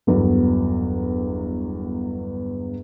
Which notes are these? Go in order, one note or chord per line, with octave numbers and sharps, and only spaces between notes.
G1 E2 F#3